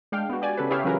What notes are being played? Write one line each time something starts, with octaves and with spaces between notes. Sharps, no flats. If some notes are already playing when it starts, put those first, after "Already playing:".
G#3 D4 F5 G5
B3 F#4
G4 D5 G#5
C#3 A4 B4
E4 G4 G#4 C#5 E5 F5
E3 F#3 C#4 F4 A#4 B4